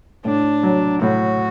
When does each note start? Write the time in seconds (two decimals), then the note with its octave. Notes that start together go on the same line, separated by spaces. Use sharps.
0.25 A2 D4
0.63 F#3
1.02 A2 F#4